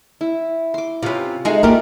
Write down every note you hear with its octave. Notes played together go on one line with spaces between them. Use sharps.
E4
C6 D6
C3 C#4 F4 B4
G#3 A3 D#4 F#4 G#4
A#3 F4 G4 A#4 D5